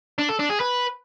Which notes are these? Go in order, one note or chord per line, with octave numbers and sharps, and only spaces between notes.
D4
A4
D4
G#4
B4